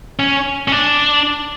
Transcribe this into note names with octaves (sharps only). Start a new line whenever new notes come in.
C#4
C#4
D4